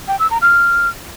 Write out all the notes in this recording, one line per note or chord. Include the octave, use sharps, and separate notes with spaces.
G5
E6
A#5
F6